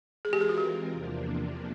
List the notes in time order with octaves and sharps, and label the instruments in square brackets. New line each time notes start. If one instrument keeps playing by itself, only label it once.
[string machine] E3 G#3 C4 F4 A#4 [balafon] G#4
[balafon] G4
G#4
F#4
G4
[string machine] E2 C3 F3 A#3 D4